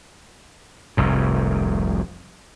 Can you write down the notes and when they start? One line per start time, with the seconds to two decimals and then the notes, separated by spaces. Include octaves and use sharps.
0.97 F1 C2 G#2